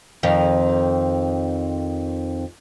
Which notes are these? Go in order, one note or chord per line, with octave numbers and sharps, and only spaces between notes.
F2 D#3